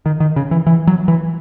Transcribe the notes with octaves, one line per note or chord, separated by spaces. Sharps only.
D#3
D#3
C#3
E3
E3
F#3
E3